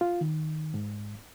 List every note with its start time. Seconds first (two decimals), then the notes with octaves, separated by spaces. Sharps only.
0.01 F4
0.21 D#3
0.74 G#2